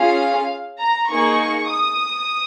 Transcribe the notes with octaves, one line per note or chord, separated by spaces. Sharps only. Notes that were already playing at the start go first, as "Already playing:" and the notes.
Already playing: C#4 F4 G#4 F5
A#5
A#3 D#4 G#4 C#6
D#6